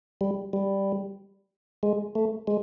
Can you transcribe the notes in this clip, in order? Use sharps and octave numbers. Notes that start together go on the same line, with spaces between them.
G3
G3
G#3
A3
G#3